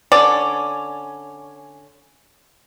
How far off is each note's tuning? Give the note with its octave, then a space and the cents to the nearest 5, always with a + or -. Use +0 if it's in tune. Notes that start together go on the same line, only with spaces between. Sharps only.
D3 +0 C#4 +0 D5 +0